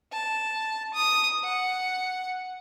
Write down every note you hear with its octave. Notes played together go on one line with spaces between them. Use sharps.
A5
D#6
F#5